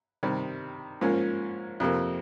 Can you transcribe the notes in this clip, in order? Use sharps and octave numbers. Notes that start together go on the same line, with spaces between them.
C3 D#3 G3
G#2 F3 A#3 C#4
F2 C3 F3 A#3